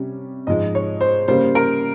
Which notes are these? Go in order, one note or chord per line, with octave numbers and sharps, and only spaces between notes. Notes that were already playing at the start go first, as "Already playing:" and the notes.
Already playing: C3 G3 C#4
G#2 F3 G#3 D#5
C#5
C5
C#3 G3 A#3 C5
A#4